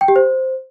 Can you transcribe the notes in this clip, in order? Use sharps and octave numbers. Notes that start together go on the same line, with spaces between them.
G5
G4
C5